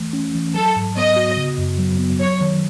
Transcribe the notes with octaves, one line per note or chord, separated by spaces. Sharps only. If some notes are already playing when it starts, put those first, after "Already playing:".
Already playing: E3 A3
C#4
E3
F#3 A4
G#2
B3 D#5
F#4
C#3
F#2
F#3
B3
F#3 C#5
D#3